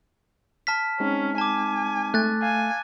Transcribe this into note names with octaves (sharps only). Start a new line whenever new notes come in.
A5 F6 B6
G#3 C4 C#4 D#4
G#5 A5 D6
A3 F#6 A6
F5 G#5